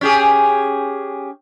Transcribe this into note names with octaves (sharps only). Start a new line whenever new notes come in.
C#4 G4 G#4